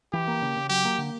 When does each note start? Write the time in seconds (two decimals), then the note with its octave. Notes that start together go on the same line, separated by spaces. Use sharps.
0.13 E3 G4
0.28 A#3
0.42 C#3
0.57 C#3
0.70 F#3 G4
0.85 A#3
0.98 D3